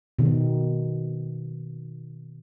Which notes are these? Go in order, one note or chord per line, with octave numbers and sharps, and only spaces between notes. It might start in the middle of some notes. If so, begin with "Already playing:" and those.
B2 D#3